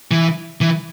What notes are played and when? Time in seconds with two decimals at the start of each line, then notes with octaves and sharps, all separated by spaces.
0.11 E3
0.61 E3